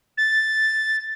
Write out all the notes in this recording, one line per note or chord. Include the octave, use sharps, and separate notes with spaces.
A6